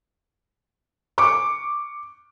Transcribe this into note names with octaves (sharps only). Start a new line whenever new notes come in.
C#6 D6